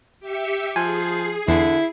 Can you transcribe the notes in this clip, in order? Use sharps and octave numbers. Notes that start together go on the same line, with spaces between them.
G4 E5 C#7
F3 G#4 G#5 C7
E2 D3 E4